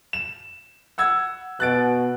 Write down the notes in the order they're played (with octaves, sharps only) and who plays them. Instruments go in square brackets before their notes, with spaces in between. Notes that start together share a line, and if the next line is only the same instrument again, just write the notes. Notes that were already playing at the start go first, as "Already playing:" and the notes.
[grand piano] E7
F#5 E6 G#6
[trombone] B2 [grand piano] F#6 A6 D7